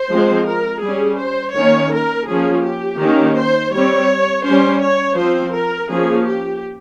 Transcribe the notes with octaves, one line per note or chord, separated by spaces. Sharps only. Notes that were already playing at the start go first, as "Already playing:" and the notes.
Already playing: C5
F3 G#3 C4
A#4
G3 C#4 G#4
C5
D#3 A#3 C#4 C#5
A#4
F3 A#3 C#4 G#4
G4
D#3 A#3 C#4
C5
G3 C4 C#5
G3 C#4 C5
C#5
F3 C4 C5
A#4
F3 A#3 C#4 G#4
G4